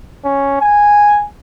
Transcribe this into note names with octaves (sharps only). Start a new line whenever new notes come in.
C#4
G#5